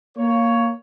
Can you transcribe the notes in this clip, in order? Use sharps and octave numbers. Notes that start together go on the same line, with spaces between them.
A#3 C#5